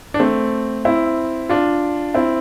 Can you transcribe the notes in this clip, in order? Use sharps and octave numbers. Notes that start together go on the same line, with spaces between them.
D4
A3 C4
C4 E4
D4 F4
C4 E4